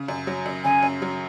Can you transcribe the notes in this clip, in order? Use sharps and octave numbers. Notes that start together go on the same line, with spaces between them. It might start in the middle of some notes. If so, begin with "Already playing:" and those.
Already playing: C#3
F#2
F#3
F#2
C#3 G#5
F#2
F#3